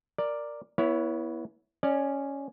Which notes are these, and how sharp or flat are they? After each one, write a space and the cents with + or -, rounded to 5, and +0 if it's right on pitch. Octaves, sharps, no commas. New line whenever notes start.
A#4 +0 D5 +5
B3 -25 E4 +0 C#5 +15
C#4 +0 D5 +25